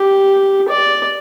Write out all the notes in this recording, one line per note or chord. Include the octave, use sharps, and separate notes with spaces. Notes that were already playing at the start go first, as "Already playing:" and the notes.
Already playing: G4
D5